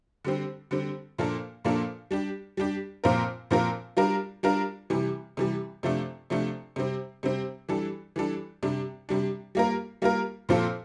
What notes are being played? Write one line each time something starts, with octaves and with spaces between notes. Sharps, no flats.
D3 G3 C4
D3 G3 C4
A#2 F3 A#3 D4 A4
A#2 F3 A#3 D4 A4
G3 D4 G4
G3 D4 G4
A#2 F3 C4 F4 A#4
A#2 F3 C4 F4 A#4
G3 D4 F4 A#4
G3 D4 F4 A#4
C3 E3 G3
C3 E3 G3
C3 F3 A3 D4
C3 F3 A3 D4
C3 G3 C4
C3 G3 C4
E3 G3 D4 A4
E3 G3 D4 A4
C3 G3 D4
C3 G3 D4
G3 A#3 F4 A#4
G3 A#3 F4 A#4
A#2 F3 C4 F4 A4